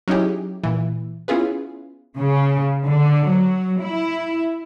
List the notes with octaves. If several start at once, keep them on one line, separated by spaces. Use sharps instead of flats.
F#3 C#4 D#4 E4 G4 G#4
A#2 E3
B3 C#4 E4 F4 G#4 B4
C#3
D3
F#3
E4